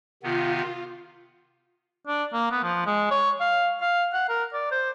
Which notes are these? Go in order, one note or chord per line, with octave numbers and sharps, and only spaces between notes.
C3 D#3 B3 F4
D4
A#3
B3
F3
G#3
C#5
F5
F5
F#5
A#4
D5
C5